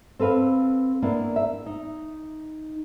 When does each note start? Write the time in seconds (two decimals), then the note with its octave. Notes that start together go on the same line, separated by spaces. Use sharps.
0.19 C4 A4 B4 F5
1.02 A#3 B3 D4 E4
1.36 E5
1.66 D#4